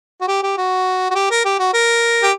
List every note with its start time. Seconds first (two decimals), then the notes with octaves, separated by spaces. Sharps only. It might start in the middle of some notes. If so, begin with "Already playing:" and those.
0.21 F#4
0.28 G4
0.43 G4
0.57 F#4
1.10 F#4
1.15 G4
1.31 A#4
1.45 G4
1.59 F#4
1.74 A#4
2.23 G4